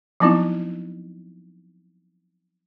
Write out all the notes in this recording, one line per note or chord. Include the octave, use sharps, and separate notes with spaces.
F3 F#3 B3 C4 D#4 E4